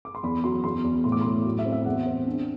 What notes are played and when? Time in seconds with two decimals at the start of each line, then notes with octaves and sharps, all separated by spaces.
0.05 D6
0.15 C6
0.23 E2 B5
0.44 F#3 C6
0.64 E2 C6
0.84 E2
1.04 A2 C6
1.12 D6
1.21 C6
1.25 A2
1.45 F#3
1.59 E5
1.65 C4
1.72 E5
1.85 E2 F#5
2.07 C4
2.27 D4